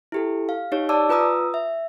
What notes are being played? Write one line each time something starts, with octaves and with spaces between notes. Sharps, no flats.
E4 G4 A4
F5
D#4 G4 C#5
D5 A5 D6 E6
F4 B4 A#5 D#6 E6
E5